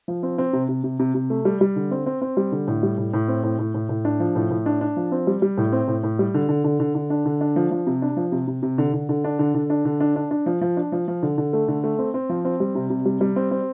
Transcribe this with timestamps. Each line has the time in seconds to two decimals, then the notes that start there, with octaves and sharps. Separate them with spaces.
0.08 F3
0.23 C4
0.38 C4
0.53 C3
0.69 C3
0.84 C3
0.99 C3
1.15 C3
1.30 A3
1.45 G3
1.61 G3
1.76 D3
1.91 C4
2.06 C4
2.22 C4
2.37 G3
2.52 D3
2.68 A2
2.83 G3
2.98 A2
3.13 A2
3.28 C4
3.43 A2
3.59 A2
3.74 A2
3.89 A2
4.05 D4
4.20 F3
4.36 A2
4.51 A2
4.66 D4
4.81 D4
4.97 F3
5.12 C4
5.27 G3
5.42 G3
5.58 A2
5.72 C4
5.88 A2
6.03 A2
6.19 G3
6.34 D3
6.49 D3
6.64 D3
6.80 D3
6.95 D3
7.10 D4
7.26 D3
7.41 D4
7.56 F3
7.71 F3
7.87 C3
8.02 D4
8.17 F3
8.32 C3
8.48 C3
8.63 C3
8.78 D3
8.94 D3
9.09 D3
9.24 D4
9.39 D3
9.55 D3
9.70 D4
9.85 D3
10.00 D4
10.16 D4
10.31 D4
10.46 F3
10.61 F3
10.77 D4
10.92 F3
11.08 F3
11.23 D3
11.38 D3
11.53 A3
11.68 D3
11.84 A3
11.99 C4
12.14 C4
12.30 F3
12.45 C4
12.60 G3
12.75 C3
12.90 C3
13.05 G3
13.21 G3
13.36 C4
13.51 C4